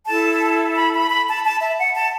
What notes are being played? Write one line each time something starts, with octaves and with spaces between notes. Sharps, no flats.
E4 A4 A5
B5
B5
B5
A5
A5
E5
F#5
A5